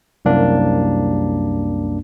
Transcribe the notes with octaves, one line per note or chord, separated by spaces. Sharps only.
C2 F#2 A#3 D4